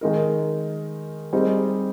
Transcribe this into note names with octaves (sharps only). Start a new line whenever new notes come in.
D#3 G#3 D#4 A#4
G3 C4 D#4 G#4